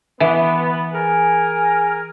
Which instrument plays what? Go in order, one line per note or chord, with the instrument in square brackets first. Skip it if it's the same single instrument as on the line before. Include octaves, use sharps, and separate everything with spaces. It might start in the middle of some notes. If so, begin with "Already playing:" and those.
[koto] E3 [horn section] B3
[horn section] G#4 A#4 G#5